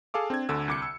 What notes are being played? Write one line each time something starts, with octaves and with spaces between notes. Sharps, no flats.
G#4 A4 F5 D6
C4 D4 G#6
D2 D3 E6
C2 D6 C#7
E6